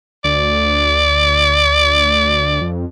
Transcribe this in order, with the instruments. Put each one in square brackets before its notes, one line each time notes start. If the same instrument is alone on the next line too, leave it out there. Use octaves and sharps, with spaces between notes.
[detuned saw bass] D2 [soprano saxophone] D5
[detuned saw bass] F2